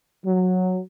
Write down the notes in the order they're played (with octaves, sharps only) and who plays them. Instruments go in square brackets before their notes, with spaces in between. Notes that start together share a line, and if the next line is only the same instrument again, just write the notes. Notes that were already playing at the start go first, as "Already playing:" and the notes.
[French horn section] F#3